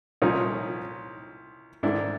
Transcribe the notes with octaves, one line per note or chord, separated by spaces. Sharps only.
C2 A#2 F3 C#4 D#4
G#2 D#3 D4 E4